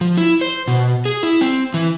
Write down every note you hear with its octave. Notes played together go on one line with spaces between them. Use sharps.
F3
E4
C5
B2
G#4
E4
C4
E3